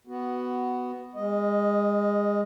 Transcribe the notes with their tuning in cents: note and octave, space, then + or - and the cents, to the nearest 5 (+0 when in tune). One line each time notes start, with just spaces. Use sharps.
B3 +5 F#4 +10
G#3 -30 D#5 +0